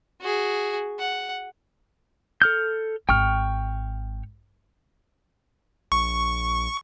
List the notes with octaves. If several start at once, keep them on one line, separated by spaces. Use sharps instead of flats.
F#4 G#4
F#5
A4 F6 G6
G#1 G5 C#6 F6
A#1 C#6